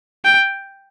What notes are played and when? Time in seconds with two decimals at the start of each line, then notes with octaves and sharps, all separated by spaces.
0.25 G5